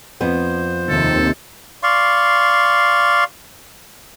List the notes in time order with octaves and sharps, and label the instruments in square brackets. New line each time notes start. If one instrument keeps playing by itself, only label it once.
[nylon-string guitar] F2 B3 [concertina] C5
[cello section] D#2 C3 [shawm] A4
[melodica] D5 F5 C6 C#6